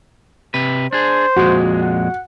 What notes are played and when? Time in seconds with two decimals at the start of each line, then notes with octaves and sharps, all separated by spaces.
0.54 C3 B4
0.93 D4 G#4 C5
1.36 F2 A#2 G#3 F#4
1.82 F#5